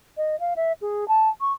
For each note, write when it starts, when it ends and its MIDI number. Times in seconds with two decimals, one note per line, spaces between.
0.17 0.39 75
0.40 0.54 77
0.56 0.72 76
0.81 1.08 68
1.08 1.29 81
1.41 1.53 85